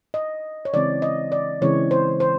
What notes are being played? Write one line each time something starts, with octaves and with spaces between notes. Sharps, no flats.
D#5
C#5
C#3 E3 G#3 C4 D5
D#5
D5
C#3 E3 G#3 C4 C#5
C5
C5